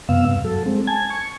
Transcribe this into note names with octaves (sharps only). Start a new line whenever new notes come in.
F#2 C3 B3 F5 E6
G2
F#3 A4
G#3 C4
G#5 A5 G#6
C#6